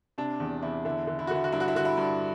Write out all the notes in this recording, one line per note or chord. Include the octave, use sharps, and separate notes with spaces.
C3 D4
E2
E2 E4
D3 E4
D3
E4
F#4
D3 E4
F#4
G2 E4
F#4
E4
D3 F#4
E4
G2